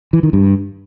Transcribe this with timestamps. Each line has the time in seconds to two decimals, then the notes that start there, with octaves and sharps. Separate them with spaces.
0.13 E3
0.23 D#3
0.33 G2